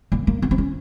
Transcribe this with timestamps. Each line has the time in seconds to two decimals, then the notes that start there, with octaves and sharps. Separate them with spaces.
0.12 A#3
0.27 A#3
0.42 B3
0.51 C4
0.58 C#4